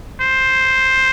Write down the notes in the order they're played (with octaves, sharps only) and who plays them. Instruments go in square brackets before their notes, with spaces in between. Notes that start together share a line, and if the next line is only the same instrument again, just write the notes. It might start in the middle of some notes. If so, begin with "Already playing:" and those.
[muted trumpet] C5